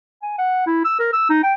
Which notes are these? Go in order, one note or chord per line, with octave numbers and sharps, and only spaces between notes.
G#5
F#5
E4
E6
A#4
E6
D#4
G5